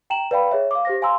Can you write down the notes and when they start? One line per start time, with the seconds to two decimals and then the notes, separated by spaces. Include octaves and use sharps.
0.10 G5 A#5 E7 F#7
0.31 B4 D5 F5 G5 B5
0.51 G#4 C#5 E5
0.71 F5 D6
0.85 G4 C5 A#6
1.02 F5 G#5 A#5 C6 E6